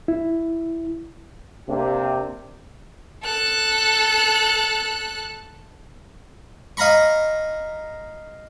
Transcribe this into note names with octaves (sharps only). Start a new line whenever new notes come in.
E4
C3 A#3 D4 G4
A4 F#6
D#5 F5 A#5 B5 C#6